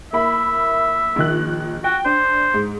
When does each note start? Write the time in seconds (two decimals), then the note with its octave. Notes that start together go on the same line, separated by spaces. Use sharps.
0.13 A#3 E4 E5 B5
1.16 A#1 D#3 F#6
1.84 F#4 G5
2.05 D4 C5
2.54 G#2